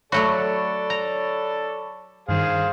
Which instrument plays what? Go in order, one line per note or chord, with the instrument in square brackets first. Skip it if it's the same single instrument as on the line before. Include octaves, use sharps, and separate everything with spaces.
[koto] F#3 A3 F#4 [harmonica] A4 D5 [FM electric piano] C#5 B5 C#6
[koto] A#5
[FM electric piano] G2 D#3 [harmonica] G#4 C5 F5